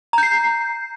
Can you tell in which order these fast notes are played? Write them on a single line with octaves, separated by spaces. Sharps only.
A#5 G6 C7